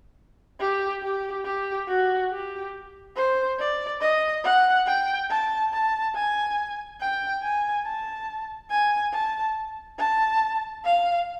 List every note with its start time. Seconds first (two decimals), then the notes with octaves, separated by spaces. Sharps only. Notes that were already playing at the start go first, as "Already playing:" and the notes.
0.60 G4
1.03 G4
1.45 G4
1.88 F#4
2.31 G4
3.16 C5
3.59 D5
4.01 D#5
4.44 F#5
4.87 G5
5.30 A5
5.73 A5
6.15 G#5
7.01 G5
7.42 G#5
7.85 A5
8.70 G#5
9.13 A5
9.98 A5
10.84 F5